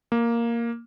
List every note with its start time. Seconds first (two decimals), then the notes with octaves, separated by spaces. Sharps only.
0.12 A#3